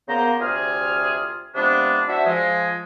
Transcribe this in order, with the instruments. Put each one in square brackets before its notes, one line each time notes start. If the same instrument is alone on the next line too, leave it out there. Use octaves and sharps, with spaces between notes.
[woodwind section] C#3 A#3 B3 C5 A#5
D2 C3 F4 G#4 F6
C3 F3 G#3 B3 D4
D4 F#4 C5 E5
F3 G#3